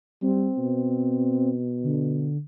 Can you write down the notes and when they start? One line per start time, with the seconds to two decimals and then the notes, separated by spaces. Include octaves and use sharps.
0.22 G3 C4
0.58 B2
1.84 D3